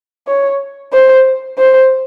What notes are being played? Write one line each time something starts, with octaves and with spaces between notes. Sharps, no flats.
C#5
C5
C5